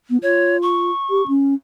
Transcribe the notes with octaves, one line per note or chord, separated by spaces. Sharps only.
B3
F4 C#5
C#6
G4
C#4